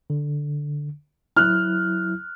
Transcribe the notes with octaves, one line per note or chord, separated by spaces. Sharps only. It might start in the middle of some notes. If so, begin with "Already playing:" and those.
D3
F#3 E4 F6 F#6